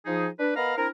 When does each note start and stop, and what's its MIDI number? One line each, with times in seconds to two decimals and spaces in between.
0.06 0.27 53
0.06 0.27 63
0.06 0.27 68
0.40 0.54 62
0.40 0.54 71
0.56 0.77 59
0.56 0.77 70
0.56 0.77 75
0.56 0.77 77
0.56 0.77 82
0.56 0.77 83
0.78 0.88 60
0.78 0.88 62
0.78 0.88 64
0.78 0.88 70